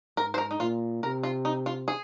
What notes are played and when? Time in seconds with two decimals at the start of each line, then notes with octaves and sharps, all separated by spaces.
0.17 G#2 A#4
0.34 C5
0.38 A#4
0.51 D#4
0.60 A#2 F4
1.03 C3 A#4
1.23 F4
1.45 D#4
1.66 F4
1.88 G#4